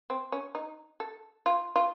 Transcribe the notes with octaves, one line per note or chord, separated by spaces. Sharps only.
C4
C#4
D#4
A4
F4
F4